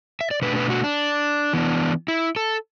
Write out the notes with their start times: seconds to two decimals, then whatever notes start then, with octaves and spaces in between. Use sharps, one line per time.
0.21 E5
0.31 D5
0.42 B2 A3 D4 B4
0.56 B4
0.70 F#4
0.84 D4
1.53 E3 B3 D4
2.08 E4
2.36 A4